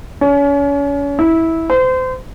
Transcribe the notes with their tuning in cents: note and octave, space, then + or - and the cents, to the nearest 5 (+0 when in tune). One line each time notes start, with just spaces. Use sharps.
C#4 +35
E4 -15
C5 -30